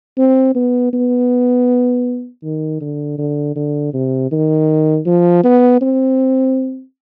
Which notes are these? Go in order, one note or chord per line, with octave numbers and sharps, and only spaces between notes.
C4
B3
B3
D#3
D3
D3
D3
C3
D#3
F3
B3
C4